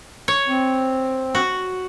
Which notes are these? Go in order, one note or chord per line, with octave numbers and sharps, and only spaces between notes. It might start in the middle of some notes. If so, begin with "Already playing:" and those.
C#5
C4
F#4